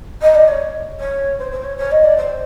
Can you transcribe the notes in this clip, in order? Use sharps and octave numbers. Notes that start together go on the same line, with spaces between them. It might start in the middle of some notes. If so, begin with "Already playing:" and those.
D#5
D5
C#5
C#5
C5
C5
C#5
C#5
D#5
D5
C5